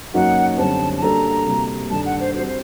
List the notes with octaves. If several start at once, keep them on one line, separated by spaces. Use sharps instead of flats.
F#2 F#3 A#3 D#4 F#4 F#5
F#2 D3 G3 C4 A5
A5
G3 A#3 D4 F#4 A4 A#5
C3 G3 A#3 F#4
G2 D#3 G3 D4 A4 A5
F#5
C5
G3 C4 F#4 C5
C5